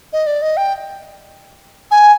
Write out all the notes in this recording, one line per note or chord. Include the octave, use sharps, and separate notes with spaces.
D#5
D5
D#5
G5
G#5